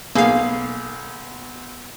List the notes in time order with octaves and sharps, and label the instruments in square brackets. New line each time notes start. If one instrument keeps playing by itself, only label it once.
[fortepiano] B1 G#4 [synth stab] A#3 F5